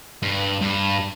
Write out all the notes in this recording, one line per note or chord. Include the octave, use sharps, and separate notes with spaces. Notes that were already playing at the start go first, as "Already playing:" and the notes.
G2
G2